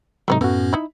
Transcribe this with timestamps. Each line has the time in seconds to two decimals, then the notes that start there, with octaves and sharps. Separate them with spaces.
0.28 G#2 C3 F#3 A3 B3 D#4
0.41 F#2 A2 A3 B3 C#4 F#4
0.73 D#4 E4